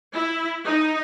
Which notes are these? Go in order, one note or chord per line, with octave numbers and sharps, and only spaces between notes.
E4
D#4